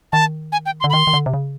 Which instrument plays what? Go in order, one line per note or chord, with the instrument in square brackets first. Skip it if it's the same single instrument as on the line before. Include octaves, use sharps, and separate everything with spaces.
[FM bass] D#3 [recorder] A5
[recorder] G#5
G5
C6
[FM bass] D3
[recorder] B5
[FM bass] D#3 [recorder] C6
[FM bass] D#3
D3
C3
C#3